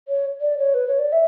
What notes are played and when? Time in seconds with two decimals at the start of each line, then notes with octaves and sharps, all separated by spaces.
0.08 C#5
0.41 D5
0.58 C#5
0.74 B4
0.88 C#5
0.99 D5
1.12 E5